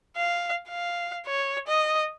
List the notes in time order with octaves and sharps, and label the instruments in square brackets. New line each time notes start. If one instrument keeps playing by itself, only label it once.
[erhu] F5
F5
C#5
D#5